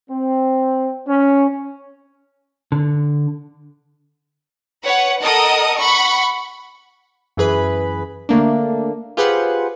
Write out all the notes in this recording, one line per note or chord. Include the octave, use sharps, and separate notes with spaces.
C4
C#4
D3
B4 C#5 F#5
A4 A#4 D#5 F#5 D#6
F#5 B5 C#6
F#2 E3 G#4 B4 B5
D3 A3 A#3 D4
F4 G4 G#4 B4 C5 F#5